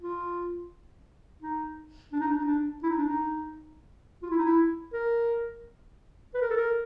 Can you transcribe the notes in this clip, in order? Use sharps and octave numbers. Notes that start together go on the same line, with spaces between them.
F4
D#4
D4
D#4
D4
D#4
D4
E4
D#4
D4
D#4
F4
E4
D#4
E4
A#4
B4
A#4
A4
A#4